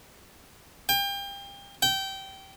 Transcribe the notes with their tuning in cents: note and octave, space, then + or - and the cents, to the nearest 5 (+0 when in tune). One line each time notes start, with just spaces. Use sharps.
G5 +30
G5 -20